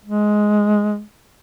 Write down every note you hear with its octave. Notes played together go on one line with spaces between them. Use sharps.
G#3